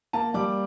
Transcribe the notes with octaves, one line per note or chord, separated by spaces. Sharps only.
A#3 A5
G3 D6